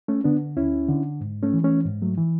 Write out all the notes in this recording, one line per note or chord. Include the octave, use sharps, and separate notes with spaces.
A3 C#4
D3 B3 D4
D2 C#4 E4
D3
G#2
A3 C#4
E3
A3 C#4
G#2
F#3 A3
E3